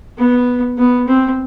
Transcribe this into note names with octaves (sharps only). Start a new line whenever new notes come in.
B3
B3
C4